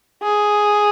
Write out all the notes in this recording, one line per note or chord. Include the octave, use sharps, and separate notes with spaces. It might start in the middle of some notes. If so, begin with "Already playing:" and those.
G#4